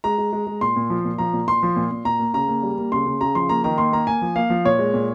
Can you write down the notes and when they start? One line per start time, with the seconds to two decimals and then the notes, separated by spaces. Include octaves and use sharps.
0.04 G#3 A#5
0.18 G#3
0.33 G#3
0.47 G#3
0.61 A#2 C6
0.76 A#2
0.90 F3
1.05 A#2
1.18 F3 A#5
1.33 A#2
1.47 A#2 C6
1.63 F3
1.76 A#2
1.91 A#2
2.05 A#2 A#5
2.20 A#3
2.34 C#3 A#5
2.48 A#3
2.63 G3
2.78 A#3
2.92 C#3 C6
3.06 C#3
3.21 C#3 A#5
3.35 F3 C6
3.49 A#3 A#5
3.64 D#3 A#5
3.78 A#3 C6
3.93 A#3 A#5
4.07 A#3 G#5
4.22 F3
4.36 A#3 F5
4.50 F3
4.65 A#2 C#5
4.79 G#3
4.94 A#2